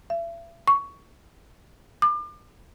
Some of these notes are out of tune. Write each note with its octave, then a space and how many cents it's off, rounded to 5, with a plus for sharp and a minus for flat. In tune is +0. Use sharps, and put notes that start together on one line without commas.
E5 +40
C#6 +15
D6 +35